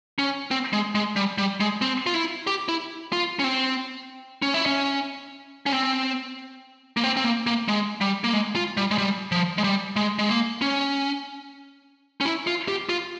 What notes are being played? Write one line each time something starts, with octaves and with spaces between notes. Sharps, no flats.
C#4
C4
G#3
G#3
G3
G3
G#3
C4
F4
E4
G4
E4
F4
C#4
C4
C#4
E4
C#4
C#4
C4
A#3
C4
C4
A#3
A#3
G#3
G3
A#3
G#3
F4
G3
G#3
G3
F3
G#3
G3
G#3
G#3
A#3
C#4
C#4
E4
F4
G4
F4